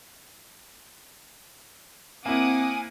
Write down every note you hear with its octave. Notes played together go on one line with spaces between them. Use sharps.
A#3 C4 E4 F#5 G#5 D6 D#6